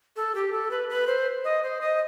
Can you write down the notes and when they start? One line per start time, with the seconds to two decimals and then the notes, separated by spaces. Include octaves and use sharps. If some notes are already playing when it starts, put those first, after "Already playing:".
0.16 A4
0.35 G4
0.52 A4
0.71 B4
0.89 B4
1.07 C5
1.45 D#5
1.63 C5
1.81 D#5